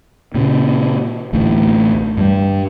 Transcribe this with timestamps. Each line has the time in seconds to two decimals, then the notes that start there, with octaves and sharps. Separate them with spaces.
0.34 A#2 C#3
1.33 A1 D2 E3
2.17 G2 G3